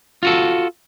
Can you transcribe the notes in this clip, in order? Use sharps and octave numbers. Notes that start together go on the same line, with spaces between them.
F4 F#4 A4